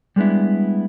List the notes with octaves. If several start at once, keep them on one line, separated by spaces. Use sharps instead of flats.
G3 G#3 B3 D4 E4